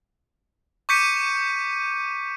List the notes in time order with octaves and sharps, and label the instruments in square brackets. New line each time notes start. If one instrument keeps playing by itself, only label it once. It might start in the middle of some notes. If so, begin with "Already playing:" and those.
[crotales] C#6 D6 G6 B6 C#7 D#7